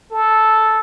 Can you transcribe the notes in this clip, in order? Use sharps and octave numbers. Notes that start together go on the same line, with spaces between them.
A4